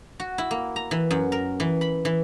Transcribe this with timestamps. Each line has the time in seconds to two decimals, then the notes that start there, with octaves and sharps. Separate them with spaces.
0.20 F#4
0.38 E4
0.51 A#3
0.76 A#5
0.91 E3
1.11 F#2
1.32 A#4
1.60 E3
1.81 B5
2.05 E3